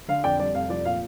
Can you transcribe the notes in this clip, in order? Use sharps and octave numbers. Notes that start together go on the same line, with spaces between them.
D3 F5
F2 D5 G5
G3 D5
F1 F5
F3 D5
A#2 F5